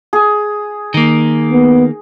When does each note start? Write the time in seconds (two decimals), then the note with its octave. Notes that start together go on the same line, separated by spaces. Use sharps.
0.13 G#4
0.94 D#3 A#3
1.52 B3